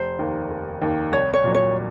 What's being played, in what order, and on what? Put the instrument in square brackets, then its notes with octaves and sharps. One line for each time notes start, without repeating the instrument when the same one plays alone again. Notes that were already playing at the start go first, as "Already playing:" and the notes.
Already playing: [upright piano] F1 [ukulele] C5
[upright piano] D#2 D#3 A#3
F1
D#2 D#3 A#3
[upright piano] C2 [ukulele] C#5
[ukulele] C#5
[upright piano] A#2 F#3
[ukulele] C#5